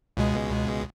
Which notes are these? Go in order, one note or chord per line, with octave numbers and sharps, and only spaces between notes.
C#2 B2 G#3